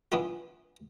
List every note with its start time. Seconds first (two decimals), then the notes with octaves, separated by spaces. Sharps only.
0.12 E3 B3 D4 E4 F4